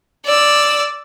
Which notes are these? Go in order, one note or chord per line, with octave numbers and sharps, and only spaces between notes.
D5 E6